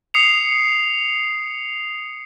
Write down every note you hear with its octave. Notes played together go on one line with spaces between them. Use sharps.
D#6 C7 C#7 F7